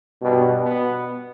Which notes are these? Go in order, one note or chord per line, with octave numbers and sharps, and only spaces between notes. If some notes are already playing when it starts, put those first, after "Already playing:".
G2 B2 G3
B2 B3